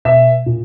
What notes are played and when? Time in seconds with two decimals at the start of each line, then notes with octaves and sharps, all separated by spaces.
0.05 B2 E5
0.46 A#2